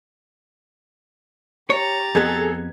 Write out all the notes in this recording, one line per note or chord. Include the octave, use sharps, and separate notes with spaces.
G4 C#5 A#5 A6
F2 B3 G#4 A4 G#6